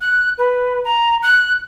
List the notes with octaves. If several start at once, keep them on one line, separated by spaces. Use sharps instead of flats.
F#6
B4
A#5
F#6